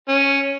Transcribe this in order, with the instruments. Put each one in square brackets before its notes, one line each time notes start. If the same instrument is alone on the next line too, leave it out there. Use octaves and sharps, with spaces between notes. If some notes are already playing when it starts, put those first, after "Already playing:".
[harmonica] C#4